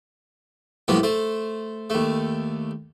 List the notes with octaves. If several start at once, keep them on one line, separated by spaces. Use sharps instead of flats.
C2 A2 F3 A#3 B3
A3 C5
D#2 A3